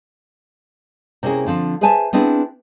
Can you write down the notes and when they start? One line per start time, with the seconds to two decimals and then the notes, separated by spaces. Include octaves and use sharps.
1.23 C3 A#3 C#4 E4 G#4
1.46 D3 F3 C4
1.81 G#4 B4 C5 E5 G#5 A5
2.13 B3 C4 D4 E4 G#4